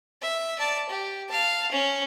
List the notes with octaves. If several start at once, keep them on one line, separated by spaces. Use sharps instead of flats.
E5
D5 A5
G4
F5 A5
C#4